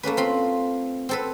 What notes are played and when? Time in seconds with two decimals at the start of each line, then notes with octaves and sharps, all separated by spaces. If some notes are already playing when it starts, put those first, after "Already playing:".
0.03 A3 A#3 C#4 B4
0.17 C4 F4 B5
1.09 C4 A4 B4